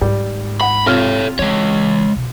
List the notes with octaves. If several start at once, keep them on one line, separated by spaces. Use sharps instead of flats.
G#2 G3
F#5 B5
C3 F4 A4 C#5 F6
E3 G#3 C#5
B2